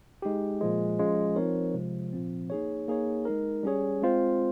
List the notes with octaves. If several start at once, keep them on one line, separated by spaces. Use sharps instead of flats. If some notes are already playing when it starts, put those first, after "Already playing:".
G#3 D#4 G4
A#2 F3 G#3
F3 G#3 C#4 F4
F3 C4 D#4 A#4 C#5
C3 F3 G#3
A#2 F3 C4
A#3 D#4 G#4 C#5
A#3 D#4 G#4 C#5
G#3 D#4 A#4
G3 C#4 G#4 C#5
G#3 C4 F4 C5